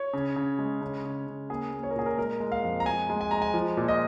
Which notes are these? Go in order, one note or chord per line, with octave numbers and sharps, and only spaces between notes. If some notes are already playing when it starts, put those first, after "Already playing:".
Already playing: C#5
C#3
C#3
G#3
C#3
C#3
C#3
A#3 G#4
A#3
C#5
A#4
A#2 G#4
A#4
G#3 A#4
G#3
F5
F2
A#5
G#3 G#5
G#3
G#5
G#3 A#5
G#5
F3
A#2
D#5